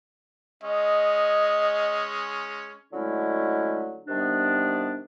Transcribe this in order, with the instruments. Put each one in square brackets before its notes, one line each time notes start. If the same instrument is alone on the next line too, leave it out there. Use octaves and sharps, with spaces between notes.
[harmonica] G#3 C#4 [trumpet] D#5
[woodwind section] D3 F#3 G#3 A3 C#4 E4
C3 D#3 G3 B3 D4